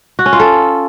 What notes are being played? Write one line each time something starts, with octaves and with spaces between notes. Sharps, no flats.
F#4
C#4
F4
A4